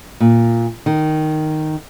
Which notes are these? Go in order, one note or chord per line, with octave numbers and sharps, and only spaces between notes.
A#2
D#3